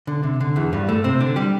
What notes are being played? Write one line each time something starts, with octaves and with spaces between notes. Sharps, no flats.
D3
C3
D3
E2 E3
G2 G3
A2 A3
C3 C4
D3 D4
G3 G4